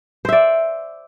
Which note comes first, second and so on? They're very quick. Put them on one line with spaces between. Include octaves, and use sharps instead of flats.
C5 E5 D5